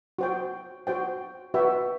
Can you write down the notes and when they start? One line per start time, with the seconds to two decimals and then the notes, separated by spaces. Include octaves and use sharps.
0.19 F#4 C5 G5
0.87 F#4 C5 G5
1.54 F#4 B4 E5 G5